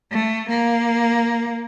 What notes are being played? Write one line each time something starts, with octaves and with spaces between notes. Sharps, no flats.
A3
A#3